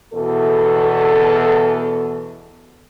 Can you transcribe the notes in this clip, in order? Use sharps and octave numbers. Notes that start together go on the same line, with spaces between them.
E2 B2 A4